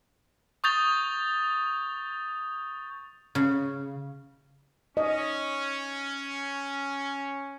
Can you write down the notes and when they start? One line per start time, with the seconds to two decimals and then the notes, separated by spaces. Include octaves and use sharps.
0.64 C#6 D#6 G6 A6 F7 G7
3.35 C#3
4.97 C#4 D#5